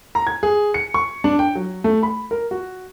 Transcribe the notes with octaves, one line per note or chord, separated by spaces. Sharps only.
A#5
G#6
G#4
C#7
C#6
D4
G5
F#3
A3
B5
A#4
F#4